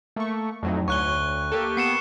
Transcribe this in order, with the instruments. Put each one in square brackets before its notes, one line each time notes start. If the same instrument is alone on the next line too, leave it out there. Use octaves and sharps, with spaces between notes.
[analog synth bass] A3 [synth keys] A#3 C#6
[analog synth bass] F2 [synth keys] A2 F#3 D#4
[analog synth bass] D2 [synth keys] C#5 [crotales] C#6 F#6 G7
[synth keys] A#3 G4 A4
[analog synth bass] B3 [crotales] C7 C#7 E7